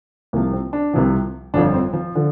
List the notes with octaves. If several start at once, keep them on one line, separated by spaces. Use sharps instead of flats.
C2 C3 F3 A#3
C4
D4
C2 C3 F3
G1 F2 D3 F3 D4
C4
F3
D3 F3